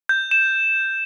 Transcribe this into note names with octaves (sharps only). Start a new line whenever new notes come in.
G6
E7